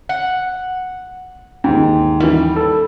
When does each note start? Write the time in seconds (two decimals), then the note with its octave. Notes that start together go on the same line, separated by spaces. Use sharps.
0.09 F#5
1.64 D#2 G#2 G5
2.20 D#3 E3 G3
2.56 A4